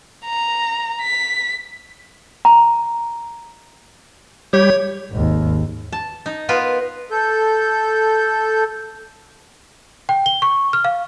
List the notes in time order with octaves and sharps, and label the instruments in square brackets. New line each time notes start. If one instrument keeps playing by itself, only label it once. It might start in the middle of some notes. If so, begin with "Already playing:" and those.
[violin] A#5
B6
[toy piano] A#5
[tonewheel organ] G3 G4 [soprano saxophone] C#5
[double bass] G#1 D#2
[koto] A5
D#4
B3 F4 A#4 B4
[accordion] A4 G6
[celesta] G5
G7
C#6
F6
F5